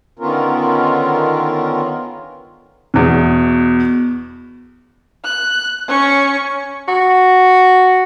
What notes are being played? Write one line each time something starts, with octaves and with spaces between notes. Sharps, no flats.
D3 D#3 B3 C#4 F4 A#4
E2 B2
F#6
C#4 C#6
F#4